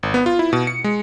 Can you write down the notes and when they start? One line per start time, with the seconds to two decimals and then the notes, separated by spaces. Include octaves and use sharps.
0.03 G#1
0.14 B3
0.26 F4
0.39 E4
0.53 B2
0.67 C#7
0.84 G#3